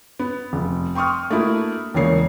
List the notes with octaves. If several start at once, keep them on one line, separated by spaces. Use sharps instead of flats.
B3
F1
G5 C6 C#6 D#6 F6
A3 A#3 D4 E4 F#4
E1 C#3 E3 A#3 C#5 C7